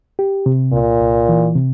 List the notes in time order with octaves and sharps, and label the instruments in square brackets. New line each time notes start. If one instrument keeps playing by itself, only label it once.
[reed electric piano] G4
C3
[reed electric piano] C2 [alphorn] A#2
[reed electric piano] C2
E3
C3